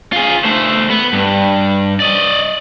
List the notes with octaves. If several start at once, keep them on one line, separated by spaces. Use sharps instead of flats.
F4 G#4
A3 C5
B3
G2
D5 D#5